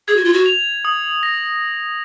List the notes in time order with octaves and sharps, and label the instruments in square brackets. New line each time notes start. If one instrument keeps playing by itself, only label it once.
[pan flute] G#4 [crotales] G#6
[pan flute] F#4
F4
F#4
[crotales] F7
D#6
A#6